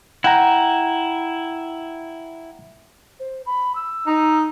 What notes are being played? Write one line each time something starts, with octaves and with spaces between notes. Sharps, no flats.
E4 F#5 G5 A#5
C5
B5
E6
D#4